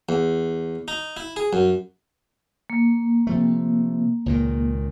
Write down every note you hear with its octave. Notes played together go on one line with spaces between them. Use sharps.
E2
D#4
E4
G#4
F#2
A#3
C3 F3 A3
C#2 A#2 D#3